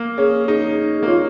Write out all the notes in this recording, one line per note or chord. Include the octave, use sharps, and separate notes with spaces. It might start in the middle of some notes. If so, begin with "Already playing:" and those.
Already playing: A#3
C#4 G#4
D#4
G#4
A#3
C#4 F4